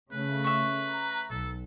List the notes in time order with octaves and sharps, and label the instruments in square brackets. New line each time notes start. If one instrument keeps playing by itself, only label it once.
[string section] C#3 A3 [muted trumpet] B4
[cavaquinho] E5 C#6
[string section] A#5
[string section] B1 [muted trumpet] A4